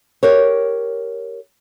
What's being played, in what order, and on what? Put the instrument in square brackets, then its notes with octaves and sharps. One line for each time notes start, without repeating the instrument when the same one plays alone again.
[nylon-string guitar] G4 A#4 C#5